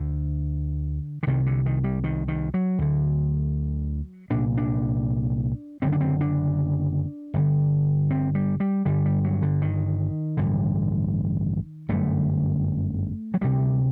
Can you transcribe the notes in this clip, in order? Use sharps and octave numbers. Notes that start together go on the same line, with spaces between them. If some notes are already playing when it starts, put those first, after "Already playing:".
Already playing: D2 D3
D3
C2 C3 D#3
D3
D#3
G3
D#3
D#3
F#3
D2 D3
C2 A#2 D4
D4
F#1 F#2 D3 C4
D4
C4
D4
G1 G2 D3
C4
G3
G3
G1 G2 D3 G3
G3
F#3
D3
D#3
A1 G2 D3
G1 F#2 D3 A3
F#3
D2 C3 G3